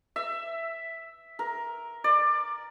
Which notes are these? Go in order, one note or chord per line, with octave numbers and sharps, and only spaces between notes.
E5
A#4
D5